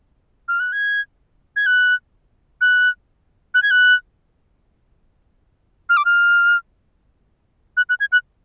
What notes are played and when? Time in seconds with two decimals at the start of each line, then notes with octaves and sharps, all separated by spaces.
0.48 F6
0.60 F#6
0.73 G#6
1.56 G#6
1.66 F#6
2.61 F#6
3.54 F#6
3.63 G#6
3.71 F#6
5.89 F6
5.97 D6
6.05 F6
7.77 F#6
7.89 F#6
8.00 G#6
8.12 F#6